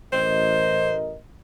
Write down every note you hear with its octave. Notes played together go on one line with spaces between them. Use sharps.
A1 A#4 C5 D#5